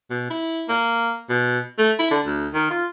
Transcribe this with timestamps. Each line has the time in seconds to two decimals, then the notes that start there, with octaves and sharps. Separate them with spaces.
0.10 B2
0.30 E4
0.69 A#3
1.29 B2
1.79 A3
1.99 E4
2.11 D3
2.26 D2
2.54 D#3
2.71 F4